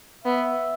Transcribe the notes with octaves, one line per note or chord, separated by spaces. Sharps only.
B3 E5